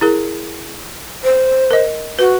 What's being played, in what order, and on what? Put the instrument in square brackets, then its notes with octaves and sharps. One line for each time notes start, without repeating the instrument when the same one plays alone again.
[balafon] E4 G#4 A#4
[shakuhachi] C5
[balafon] A#4 D#5
[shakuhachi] F#4 [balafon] B4